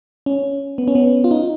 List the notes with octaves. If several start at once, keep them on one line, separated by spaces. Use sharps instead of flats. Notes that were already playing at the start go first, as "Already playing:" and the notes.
C#4
B3
C#4
B3
F4
D#4